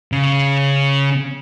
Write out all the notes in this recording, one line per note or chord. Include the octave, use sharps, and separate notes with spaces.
C#3